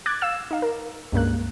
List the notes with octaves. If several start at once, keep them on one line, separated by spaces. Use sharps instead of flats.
D6 F#6 G#6 A6
F5 E6 E7
D#4 F5
A#4
C#2 G2 A#3 F#6